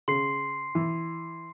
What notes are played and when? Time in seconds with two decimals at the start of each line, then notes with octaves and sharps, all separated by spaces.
0.08 C#3 C6 C7
0.75 E3